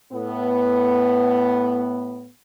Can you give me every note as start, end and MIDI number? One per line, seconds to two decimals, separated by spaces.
0.13 2.29 45
0.13 2.29 59